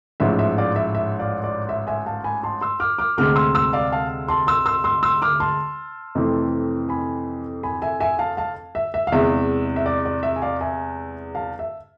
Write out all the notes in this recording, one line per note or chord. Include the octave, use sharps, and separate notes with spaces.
A1 G#2 F3 E5
E5
D5 F5
E5
E5
D5 F5
D5
E5
E5 G#5
F5 A5
G#5 B5
A5 C6
C6 E6
D6 F6
D6 F6
D2 C3 G#3 C4 D6 F6
C6 E6
C6 E6
D5 F5
F5 A5
A5 C6
C6 E6
C6 E6
C6 E6
C6 E6
D6 F6
A5 C6
F2 C3 E3 A3 C4
G#5 B5
G#5 B5
E5 G#5
E5 G#5
F5 A5
F5 A5
E5
E5
F5
E2 C3 G#3 E5
E5
D5
D5
E5
G#5
D5 F5
E5 G#5
F5 A5
E5